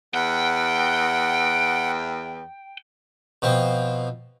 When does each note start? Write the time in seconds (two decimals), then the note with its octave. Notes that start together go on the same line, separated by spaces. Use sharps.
0.14 E2 F#5 G5
3.42 B2 F3 C4